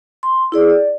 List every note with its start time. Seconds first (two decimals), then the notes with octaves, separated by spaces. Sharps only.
0.23 C6
0.52 E4 G#4 D5
0.70 D5